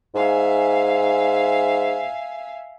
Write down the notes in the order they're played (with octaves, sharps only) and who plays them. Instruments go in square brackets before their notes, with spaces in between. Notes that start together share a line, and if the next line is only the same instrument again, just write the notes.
[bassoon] G#2 [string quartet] E5 F5 G#5